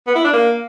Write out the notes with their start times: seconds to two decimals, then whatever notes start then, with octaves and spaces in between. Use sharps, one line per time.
0.07 B3
0.16 E4
0.24 D4
0.33 A#3